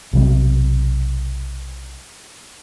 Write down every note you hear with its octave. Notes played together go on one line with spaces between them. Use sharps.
B1 C3 F#3